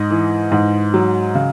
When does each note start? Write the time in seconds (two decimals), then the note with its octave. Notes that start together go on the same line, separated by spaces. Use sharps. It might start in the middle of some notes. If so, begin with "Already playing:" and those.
Already playing: G#2 D#5
0.10 E3
0.51 G#2
0.94 F#3
1.35 C#3